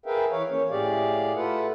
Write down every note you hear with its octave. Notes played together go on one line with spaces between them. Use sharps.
G#4 A#4 B4 E5 F5 G5
E3 C#5 F5
A#3 C#4 C#5
A2 G4 G#4 D5 F5
A3 F4 A4 B4 F#5